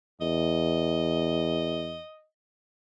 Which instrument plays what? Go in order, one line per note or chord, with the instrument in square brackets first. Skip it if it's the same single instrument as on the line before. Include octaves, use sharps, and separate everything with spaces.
[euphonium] E2 [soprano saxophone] D#5